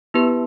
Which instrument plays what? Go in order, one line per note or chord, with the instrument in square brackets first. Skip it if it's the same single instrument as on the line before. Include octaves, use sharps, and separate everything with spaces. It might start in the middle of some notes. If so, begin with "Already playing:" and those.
[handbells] B3 E4 G4 B4